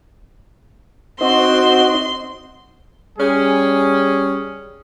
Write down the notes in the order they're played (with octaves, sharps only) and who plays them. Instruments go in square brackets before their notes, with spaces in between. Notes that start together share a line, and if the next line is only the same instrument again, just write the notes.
[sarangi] C4 [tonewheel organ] D#4 C5 D#5 [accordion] F#4 [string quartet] C6
[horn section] G3 C#4 G#4